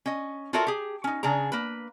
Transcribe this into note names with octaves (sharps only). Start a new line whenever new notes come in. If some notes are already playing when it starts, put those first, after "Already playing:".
C#4 D#5
F4 F#4 A4 A#4 C#5 E5
G4 G#4
C#4 D#4
C#3 D4 G#4 A#5
A#3 B4